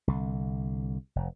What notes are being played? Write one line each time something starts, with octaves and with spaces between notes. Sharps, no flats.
C2 D3
F1